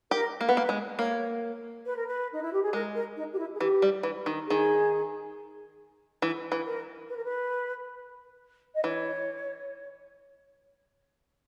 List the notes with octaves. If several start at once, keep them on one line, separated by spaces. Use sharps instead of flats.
G4 A#4
A#3
B3 A#4
A#3 B4
G#3
A#3 C#5
B4
A#4
B4
D#4
E4
G4
G#4
G#3 A#4
A#4
D#4
G4
E4
G#4
E3 G4
G3
E3
D#3
D#3 G#4
E3
E3
A#4
B4
A#4
B4
D#5
E3 C#5